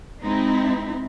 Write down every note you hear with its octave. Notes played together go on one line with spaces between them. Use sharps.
G#3 C4 D#4 E4